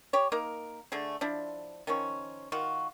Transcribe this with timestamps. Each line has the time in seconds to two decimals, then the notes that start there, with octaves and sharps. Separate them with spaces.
0.13 G4 C#5
0.32 A#3 D#4 A#4
0.92 D3 A3 G#4
1.21 F3 D4 E4
1.87 D#3 F3 C#4 C#6
2.52 D#3 F4 F#4